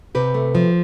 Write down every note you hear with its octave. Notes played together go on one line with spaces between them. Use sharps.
C3 G4 B4
A3
F3